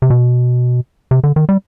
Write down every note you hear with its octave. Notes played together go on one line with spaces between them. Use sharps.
C3
B2
C3
D3
D#3
G3